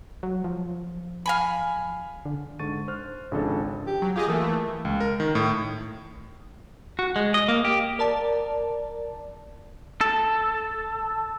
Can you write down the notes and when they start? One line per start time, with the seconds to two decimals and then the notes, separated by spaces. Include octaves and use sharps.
0.23 F#3
0.44 F3
1.26 F5 G#5 B5
2.25 D3
2.59 G#2 D3 C#6 A6 D#7
2.88 C5 F6 F#6
3.31 G#1 C#3 F3 D4 A4
3.87 G4
4.02 F#3
4.16 F4 G4 G#4 D#5
4.28 E3 A3 A#3
4.85 C#2
5.00 A#4
5.20 D#3
5.35 A2
6.99 F#4
7.16 G#3
7.34 D#5
7.48 A#3
7.65 G4
7.99 A#4 D5 A5
10.01 A4